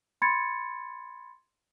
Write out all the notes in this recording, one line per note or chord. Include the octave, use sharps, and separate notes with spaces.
B5 C6 G#6 A6 C#7